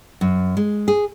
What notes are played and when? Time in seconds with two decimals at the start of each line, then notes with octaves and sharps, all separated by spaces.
0.21 F#2
0.57 G#3
0.88 G#4